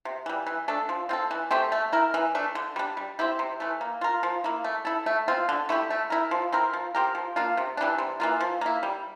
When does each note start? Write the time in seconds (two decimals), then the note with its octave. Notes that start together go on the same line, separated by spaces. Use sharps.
0.05 C3
0.26 E3 G3
0.47 E3
0.68 A3 D4 A4
0.89 F3
1.09 C4 F4 A4
1.31 E3
1.51 A3 C4 G4
1.72 A3
1.93 E4 A#4
2.14 E3
2.35 A3 D4
2.55 D3
2.76 G3 D4
2.97 G3
3.19 C4 E4 G4
3.39 C3
3.60 E3 A3
3.81 A#3
4.01 F4 A#4
4.23 F3
4.44 A#3 E4
4.64 A3
4.85 E4 A4
5.06 A3
5.28 C4 F4
5.49 D3
5.69 A3 E4 G4
5.90 A3
6.10 E4 A#4
6.31 F3
6.52 C4 E4 A#4
6.73 F3
6.95 C4 G4 A#4
7.15 F3
7.36 A#3 D4 F4
7.57 C3
7.77 E3 G3 D4
7.98 C3
8.20 E3 A#3 F4
8.40 F3
8.61 A#3 E4
8.83 G3